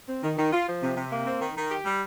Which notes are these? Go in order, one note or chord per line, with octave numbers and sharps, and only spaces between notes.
C4
D#3
D#3
F4
F3
C3
C3
A#3
C4
D#3
D#3
G4
G3